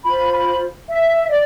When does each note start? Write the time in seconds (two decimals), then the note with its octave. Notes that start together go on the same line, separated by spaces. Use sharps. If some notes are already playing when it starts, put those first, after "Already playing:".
0.05 F4 C5 B5
0.33 B5
0.88 E5
1.30 D5